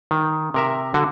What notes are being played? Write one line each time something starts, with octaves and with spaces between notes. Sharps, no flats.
D#3
C3 A#4 E5
D3 F#4